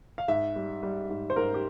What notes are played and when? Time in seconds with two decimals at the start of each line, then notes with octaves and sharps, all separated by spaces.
0.18 F5
0.28 G#2 E5
0.56 G3
0.83 G3
1.10 G#2
1.30 C5
1.36 G#2 A#4
1.54 G4